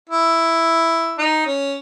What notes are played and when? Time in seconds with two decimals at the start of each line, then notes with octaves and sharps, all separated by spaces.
0.09 E4
1.18 D#4
1.46 C#4